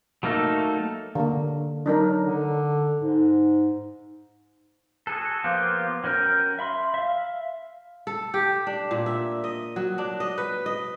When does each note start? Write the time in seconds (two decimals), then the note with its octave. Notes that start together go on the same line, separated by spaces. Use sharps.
0.23 F#3 A3 A#3 D#4 A4
1.15 D3 A#3
1.86 F#3 D4 D#4 A#4
2.27 D3
3.02 G#2
5.07 F#4 G#4 A4
5.44 F3 A#3 B3 F4 G4
6.04 F#3 C#4 A#4 G5 F6
6.59 E5 B5 C6
6.94 E5 F5
8.07 A4
8.34 G4
8.67 D4
8.91 A#2
9.06 E5
9.44 D#5
9.76 F#3
9.98 D4
10.20 D#5
10.38 B4
10.66 D#5